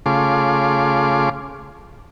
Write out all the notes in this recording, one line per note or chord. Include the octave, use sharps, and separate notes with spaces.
C#3 A3 F4 G#4 C6 D6